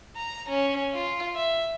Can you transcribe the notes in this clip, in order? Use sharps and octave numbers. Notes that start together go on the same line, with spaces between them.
A#5
C#4
F4
E5